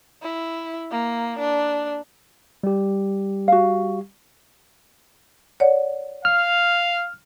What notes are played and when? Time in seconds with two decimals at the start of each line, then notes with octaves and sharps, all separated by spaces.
0.22 E4
0.91 A#3
1.39 D4
2.63 G3 G4
3.48 F#4 F5
5.60 C#5 D5 F#5
6.25 F5 F6